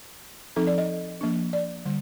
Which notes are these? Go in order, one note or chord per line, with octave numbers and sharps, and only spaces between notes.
F3 C4 D#4 A4
D5
D#5
F3 A#3 D4
D5
D3 G3